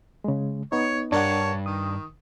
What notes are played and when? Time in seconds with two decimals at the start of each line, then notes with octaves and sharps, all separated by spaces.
0.24 C#3 G#3
0.72 B3 D#4 C#5
1.12 G2 D4 A#4 C#5 F#5 A5
1.66 D#3 D#6